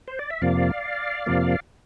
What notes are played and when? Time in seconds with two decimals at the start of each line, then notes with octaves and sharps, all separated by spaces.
0.08 C5
0.19 D5
0.30 E5
0.42 F2 C3 F3 A#3 D5 F5
1.26 F2 C3 F3 A#3